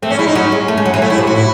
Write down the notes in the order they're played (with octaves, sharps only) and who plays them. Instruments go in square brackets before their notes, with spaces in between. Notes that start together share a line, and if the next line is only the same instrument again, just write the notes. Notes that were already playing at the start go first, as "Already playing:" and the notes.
[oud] A3 [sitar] C4
[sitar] C#4
[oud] G#3 [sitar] E4
[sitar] D#4
[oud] F#3 [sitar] C#4
[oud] G#3
A3
G#3
F#3
E3
[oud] F#3 [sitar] A3
[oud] G#3 [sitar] E4
[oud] C3
[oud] A2 [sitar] F#4
[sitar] E4